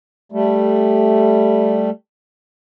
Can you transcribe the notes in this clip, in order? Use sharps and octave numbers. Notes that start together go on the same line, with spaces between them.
G3 A3